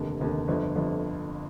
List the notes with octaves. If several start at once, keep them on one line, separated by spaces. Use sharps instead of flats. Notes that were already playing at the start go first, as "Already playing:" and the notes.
Already playing: F1 D#2 D3
F1 D#2 D3
G1 F2 D3
G1 F2 D3